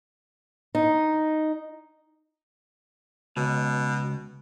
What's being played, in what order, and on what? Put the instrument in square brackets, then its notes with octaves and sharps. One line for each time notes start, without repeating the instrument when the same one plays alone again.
[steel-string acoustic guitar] D#4
[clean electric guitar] C#2 [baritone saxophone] B2